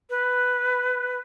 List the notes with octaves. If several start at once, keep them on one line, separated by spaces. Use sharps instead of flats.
B4